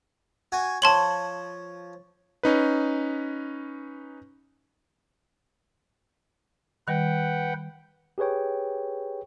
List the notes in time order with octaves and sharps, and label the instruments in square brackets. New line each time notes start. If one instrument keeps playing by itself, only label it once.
[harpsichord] F#4 G#5
[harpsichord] F3 C#5 [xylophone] A5 C6 F#7
[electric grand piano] C#4 D#4 B4
[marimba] D#3 G3 [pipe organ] B4 F#5 G5
[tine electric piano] G4 G#4 B4 C#5 G5